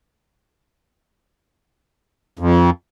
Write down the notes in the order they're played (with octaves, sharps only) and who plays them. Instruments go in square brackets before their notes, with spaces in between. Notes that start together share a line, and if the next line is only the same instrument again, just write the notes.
[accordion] F2